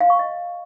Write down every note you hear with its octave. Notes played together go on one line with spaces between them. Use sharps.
F5
C#6
D#5